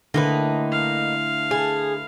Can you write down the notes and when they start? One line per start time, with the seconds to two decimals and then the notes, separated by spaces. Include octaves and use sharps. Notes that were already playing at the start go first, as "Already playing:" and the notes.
0.14 A2 D3 A#3 D#4 B4
0.71 F5
1.51 G#4 B4 A5